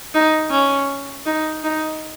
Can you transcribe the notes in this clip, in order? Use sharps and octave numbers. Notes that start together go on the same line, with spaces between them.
D#4
C#4
D#4
D#4